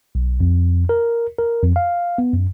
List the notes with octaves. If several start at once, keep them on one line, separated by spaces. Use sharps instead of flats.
B1
F2
A#4
A#4
F2
F5
B3
F#2